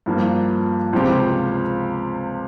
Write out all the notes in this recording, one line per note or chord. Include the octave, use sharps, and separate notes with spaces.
G2 F3 A#3
C#2 C3 F3 C4 G4